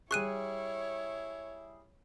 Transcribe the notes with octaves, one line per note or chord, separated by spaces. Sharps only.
G3 E4 G#4 C#5 C#6 F#6 D#7